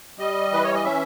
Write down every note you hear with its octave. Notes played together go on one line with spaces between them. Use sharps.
G3 D#5
E3 B4
C#5
D#5
C#4 E5